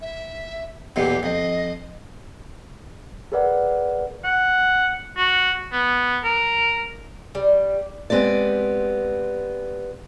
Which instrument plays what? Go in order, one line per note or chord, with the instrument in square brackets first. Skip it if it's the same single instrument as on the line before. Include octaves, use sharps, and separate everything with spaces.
[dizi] E5
[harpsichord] B1 E2 A#2 [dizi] G4
[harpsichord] F2 [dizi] D#5
[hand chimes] G#4 A#4 B4 D5 F#5
[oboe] F#5
F#4
B3
A#4
[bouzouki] G3
[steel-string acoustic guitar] G#3 B3 C4 G4 D5